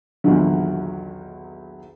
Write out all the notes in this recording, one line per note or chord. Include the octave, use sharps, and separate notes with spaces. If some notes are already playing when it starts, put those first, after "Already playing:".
B1 E2 A#2 D3 D#3 F#3